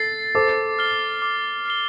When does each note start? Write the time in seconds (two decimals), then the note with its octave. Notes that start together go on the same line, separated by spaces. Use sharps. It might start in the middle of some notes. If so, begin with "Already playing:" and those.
Already playing: A4 A6 C7
0.35 A4 C5 D6
0.79 F6 C7 G7
1.22 D6
1.66 F6 C7 G7